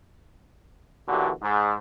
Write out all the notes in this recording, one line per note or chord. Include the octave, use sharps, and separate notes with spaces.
B1 A#2 D3 E3 F#4 G4
G#2